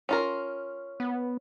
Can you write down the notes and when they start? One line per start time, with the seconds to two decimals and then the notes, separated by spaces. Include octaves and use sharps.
0.09 C#4 F4 A#4
1.00 B3